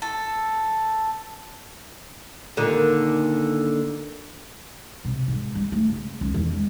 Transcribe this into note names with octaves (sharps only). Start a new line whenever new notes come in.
A4
A#2 D3 D#3
C3
G#2
G3
A3
C#3
C#2
E2
G#3